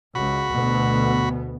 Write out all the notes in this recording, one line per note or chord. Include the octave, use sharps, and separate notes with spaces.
C#2 F#4 B5
D2 B2 B3